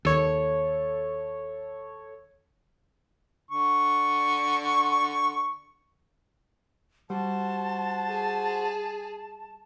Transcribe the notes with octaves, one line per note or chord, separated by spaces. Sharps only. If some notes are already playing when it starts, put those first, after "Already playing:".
D#2 A4 C#5
D3 C#6
G3 F#4 C5 A5
G#4